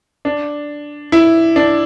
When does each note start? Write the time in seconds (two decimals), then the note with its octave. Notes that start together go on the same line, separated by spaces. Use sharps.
0.25 D4
1.12 E4
1.56 D4